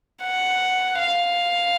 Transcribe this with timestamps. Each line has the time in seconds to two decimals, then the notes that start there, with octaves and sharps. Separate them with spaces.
0.23 F#5
0.99 F5